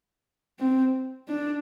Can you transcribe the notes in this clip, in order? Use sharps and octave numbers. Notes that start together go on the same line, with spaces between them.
C4
D4